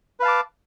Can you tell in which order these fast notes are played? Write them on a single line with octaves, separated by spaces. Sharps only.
B4 F5 A5 D6